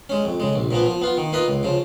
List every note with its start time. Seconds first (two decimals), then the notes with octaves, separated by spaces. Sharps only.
0.09 G#3 C#4
0.25 F2
0.40 C#3 G#3
0.56 A#1
0.71 A#2 F3 B3
0.86 F3
1.01 B3 F4
1.17 D#3
1.32 A#3 F4 B4 D#5
1.48 C#2
1.63 C#3 F3